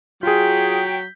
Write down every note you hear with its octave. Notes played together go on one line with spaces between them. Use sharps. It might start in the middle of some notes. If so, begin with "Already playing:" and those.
F#3 F4 G#4 G5 G6 B6